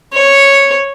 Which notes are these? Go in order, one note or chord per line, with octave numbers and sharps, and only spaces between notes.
C#5